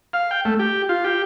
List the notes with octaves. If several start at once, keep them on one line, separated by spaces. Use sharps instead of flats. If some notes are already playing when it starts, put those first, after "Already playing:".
F5
G5
A3
G4
F4
G4